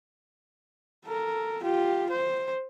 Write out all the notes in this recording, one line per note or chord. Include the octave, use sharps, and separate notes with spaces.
A4 A#4
F4 G4
C5